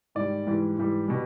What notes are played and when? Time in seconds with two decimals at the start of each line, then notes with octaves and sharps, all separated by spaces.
0.15 G#2 D#3 G3 D5
0.47 G#2 E3 G3
0.77 G#2 E3 G3
1.08 B2 G3